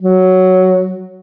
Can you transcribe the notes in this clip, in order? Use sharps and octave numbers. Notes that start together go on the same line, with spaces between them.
F#3